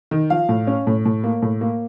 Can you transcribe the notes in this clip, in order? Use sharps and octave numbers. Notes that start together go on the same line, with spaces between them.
D#3
F3 F5
A2
C#4
A2
A2
A#3
A2
A#3